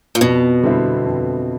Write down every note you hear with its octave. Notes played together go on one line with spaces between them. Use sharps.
A#2
F2 B2
D3 G3 C4 E4
F2